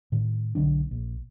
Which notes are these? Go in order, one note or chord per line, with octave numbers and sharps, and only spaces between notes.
A2 D#3
B1 D3 F#3 D4
A#1